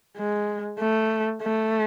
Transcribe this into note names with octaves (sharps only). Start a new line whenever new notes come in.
G#3
A3
A3